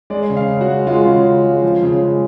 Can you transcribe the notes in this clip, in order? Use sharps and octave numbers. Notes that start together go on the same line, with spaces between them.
G#3 D5
C#3
F5
C#3
F#4
G#3
G#3 F4
C#3
C#3
G#3
F3
C#3
G#3